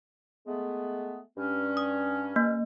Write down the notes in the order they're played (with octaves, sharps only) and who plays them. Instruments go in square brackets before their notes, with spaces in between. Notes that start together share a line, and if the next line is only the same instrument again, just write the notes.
[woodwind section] G#3 A3 B3
G2 C#4
[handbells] D#6
A#3